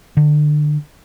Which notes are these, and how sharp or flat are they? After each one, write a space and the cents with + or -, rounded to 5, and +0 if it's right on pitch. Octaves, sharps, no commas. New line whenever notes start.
D3 +25